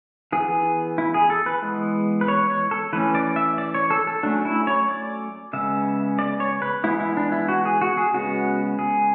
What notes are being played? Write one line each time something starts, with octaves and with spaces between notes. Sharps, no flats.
E3 B3 G#4
E4
G#4
A4
B4
E3 G#3 B3
B4
C#5
C#5
A4
E3 A3 C#4 B4
D5
E5
D5
C#5
A4
A4
F#3 A3 C#4 D4
E4
C#5
D5
C#3 G#3 B3 E5
D5
C#5
B4
E3 G#3 B3 E4
E4
D4
E4
F#4
G#4
F#4
G#4
C#3 G#3 B3 F#4
G#4